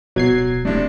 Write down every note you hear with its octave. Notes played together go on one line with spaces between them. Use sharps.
D1 B2 F#3 G#6 C7
A2 C3 D4